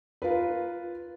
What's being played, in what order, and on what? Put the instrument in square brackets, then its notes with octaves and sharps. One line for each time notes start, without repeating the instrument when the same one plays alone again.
[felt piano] F4 A#4 B4